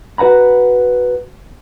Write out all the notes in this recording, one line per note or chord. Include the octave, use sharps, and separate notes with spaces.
F#4 B4 F#5 A#5 B5